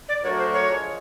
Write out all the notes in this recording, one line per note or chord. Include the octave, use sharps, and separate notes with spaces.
D5
F#3 A3 D4 F#4 A#4 C#5
C5
C#5
F3 G#3